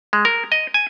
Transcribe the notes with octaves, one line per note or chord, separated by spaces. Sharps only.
G#3
A#4
D#5
G#5